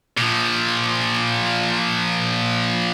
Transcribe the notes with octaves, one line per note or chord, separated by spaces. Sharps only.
A#2 F3